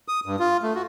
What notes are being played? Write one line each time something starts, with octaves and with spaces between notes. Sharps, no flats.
D#6
G2
F4
A3
F#4